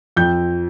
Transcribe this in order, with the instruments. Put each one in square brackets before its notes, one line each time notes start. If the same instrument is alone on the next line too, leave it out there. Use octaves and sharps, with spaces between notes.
[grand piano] F2 G6